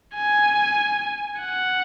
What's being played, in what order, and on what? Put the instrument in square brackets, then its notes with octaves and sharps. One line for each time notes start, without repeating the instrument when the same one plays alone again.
[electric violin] G#5
F#5